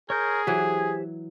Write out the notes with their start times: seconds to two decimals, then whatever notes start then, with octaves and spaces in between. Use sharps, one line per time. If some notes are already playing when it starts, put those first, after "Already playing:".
0.10 G#4 A#4 C#5 G6
0.47 E3 F#3 G4 C5 G#5